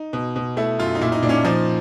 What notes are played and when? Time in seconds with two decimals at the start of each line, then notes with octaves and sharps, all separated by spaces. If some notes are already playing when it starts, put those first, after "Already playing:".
Already playing: D#4
0.13 B2
0.36 B2
0.57 A3 E4
0.79 F#2 F4
0.95 D#4
1.01 A#2 E4
1.12 D#4
1.22 A#2 D4
1.29 C#4
1.34 D4
1.45 F3 D#4